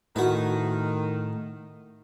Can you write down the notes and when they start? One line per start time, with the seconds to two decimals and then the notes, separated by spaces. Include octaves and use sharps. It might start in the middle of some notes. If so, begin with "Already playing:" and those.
0.16 A2 D#3 F#4 B4